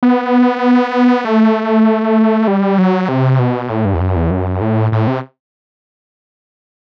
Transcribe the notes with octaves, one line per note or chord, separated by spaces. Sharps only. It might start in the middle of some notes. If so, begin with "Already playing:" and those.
B3
A3
G3
F#3
C3
B2
A2
G2
E2
F#2
E2
F#2
A2
A2
C3